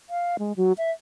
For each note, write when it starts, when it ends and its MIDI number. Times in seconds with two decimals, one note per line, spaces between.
0.10 0.36 77
0.39 0.56 56
0.56 0.73 54
0.78 0.91 76